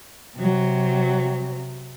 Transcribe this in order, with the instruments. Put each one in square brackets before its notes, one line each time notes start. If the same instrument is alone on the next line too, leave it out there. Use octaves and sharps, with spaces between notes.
[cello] C3 F#3